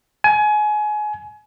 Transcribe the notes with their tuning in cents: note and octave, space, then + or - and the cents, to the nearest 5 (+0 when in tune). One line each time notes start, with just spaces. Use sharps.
G#5 +25